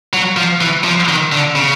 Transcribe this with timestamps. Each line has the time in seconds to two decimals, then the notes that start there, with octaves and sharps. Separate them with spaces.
0.13 F#3
0.37 F3
0.61 E3
0.84 F3
1.08 D#3
1.32 D3
1.55 C#3